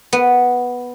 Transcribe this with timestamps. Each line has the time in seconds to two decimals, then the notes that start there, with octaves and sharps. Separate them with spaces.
0.13 B3